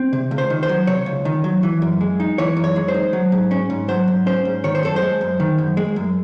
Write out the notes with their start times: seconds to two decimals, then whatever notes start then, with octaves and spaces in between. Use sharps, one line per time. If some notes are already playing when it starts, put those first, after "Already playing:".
Already playing: C4
0.13 C3
0.31 C#2
0.38 C5
0.50 D#3
0.63 C5
0.69 F#3
0.87 C3 C#5
1.06 C#2
1.25 D#3
1.44 F#3
1.63 E3
1.82 F#2
2.01 G#3
2.20 D#4
2.38 E3 C#5
2.57 F#2
2.64 C#5
2.76 G#3
2.88 C5
2.94 D#4
3.13 F#3
3.32 G#2
3.51 C#4
3.70 G#2
3.88 F#3 C5
4.08 G#2
4.26 C#4 C5
4.45 G#2
4.64 D#3 C#5
4.75 C5
4.83 F#2 A4
4.96 C5
5.02 G#3
5.21 F#2
5.40 D#3
5.58 F#2
5.77 G#3
5.96 F#2